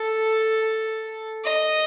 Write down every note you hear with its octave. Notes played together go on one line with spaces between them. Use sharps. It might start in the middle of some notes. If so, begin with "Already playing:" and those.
Already playing: A4
D#5